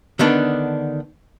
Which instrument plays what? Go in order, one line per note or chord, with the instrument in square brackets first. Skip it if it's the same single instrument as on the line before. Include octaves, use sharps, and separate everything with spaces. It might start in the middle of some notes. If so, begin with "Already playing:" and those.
[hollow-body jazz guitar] D3 D#3 B3 D4